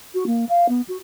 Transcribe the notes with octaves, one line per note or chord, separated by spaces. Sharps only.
F#4
A#3
F5
B3
F#4